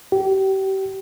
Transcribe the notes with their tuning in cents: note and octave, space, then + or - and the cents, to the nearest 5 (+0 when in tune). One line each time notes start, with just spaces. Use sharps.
G4 -30